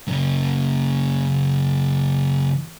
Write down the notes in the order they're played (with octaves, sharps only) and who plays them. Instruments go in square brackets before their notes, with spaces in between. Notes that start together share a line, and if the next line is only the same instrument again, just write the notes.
[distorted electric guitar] F#2 C#3